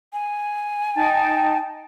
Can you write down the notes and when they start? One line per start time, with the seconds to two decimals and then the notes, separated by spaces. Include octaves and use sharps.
0.13 G#5
0.96 D#4 G5 A5